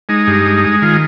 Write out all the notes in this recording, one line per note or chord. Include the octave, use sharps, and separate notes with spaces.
G#3 D#4
G2
G#3
G#3
D#3 F4